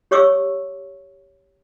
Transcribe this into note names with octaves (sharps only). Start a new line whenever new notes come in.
G4 C#5 C#6 D6 E6